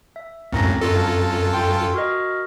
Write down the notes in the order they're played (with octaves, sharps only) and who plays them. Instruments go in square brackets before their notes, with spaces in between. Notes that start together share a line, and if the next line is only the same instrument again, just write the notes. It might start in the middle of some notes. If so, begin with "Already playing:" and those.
[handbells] E5
[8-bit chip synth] C#2 F#2 A2 [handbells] C4 A#5 A#6
[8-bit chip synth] F#2 F4 A4
[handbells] G5 C6
F#4 A#4 D#5